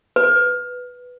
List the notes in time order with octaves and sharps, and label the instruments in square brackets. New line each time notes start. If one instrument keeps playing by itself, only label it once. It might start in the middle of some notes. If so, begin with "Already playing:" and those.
[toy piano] B4